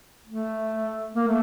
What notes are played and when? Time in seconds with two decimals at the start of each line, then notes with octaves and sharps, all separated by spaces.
0.27 A3
1.15 A#3
1.27 A3